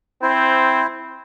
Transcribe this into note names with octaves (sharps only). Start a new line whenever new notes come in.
C4 E4 C5